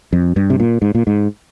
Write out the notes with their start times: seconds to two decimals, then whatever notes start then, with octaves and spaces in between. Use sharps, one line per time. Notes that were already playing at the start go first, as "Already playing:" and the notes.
0.13 F2
0.36 G2
0.50 C3
0.60 A#2
0.82 G#2
0.95 A#2
1.07 G#2